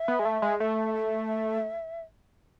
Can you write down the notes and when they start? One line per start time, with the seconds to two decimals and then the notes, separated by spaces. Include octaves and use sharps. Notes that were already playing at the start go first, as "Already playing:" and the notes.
Already playing: E5
0.08 B3
0.19 G#3
0.25 A3
0.42 G#3
0.60 A3 E5
0.94 E5